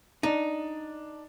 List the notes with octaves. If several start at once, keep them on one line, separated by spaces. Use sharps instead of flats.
D4 D#4